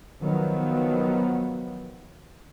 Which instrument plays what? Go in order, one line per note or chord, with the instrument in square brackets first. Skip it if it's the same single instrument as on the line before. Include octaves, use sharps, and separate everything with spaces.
[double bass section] D#3 F3 F#3 B3